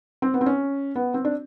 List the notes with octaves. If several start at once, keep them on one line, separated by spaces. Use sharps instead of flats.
C4
B3
C4
C#4
B3
C4
D4